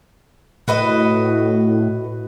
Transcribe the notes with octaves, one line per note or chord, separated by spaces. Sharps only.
A2 F#4 B4 D#5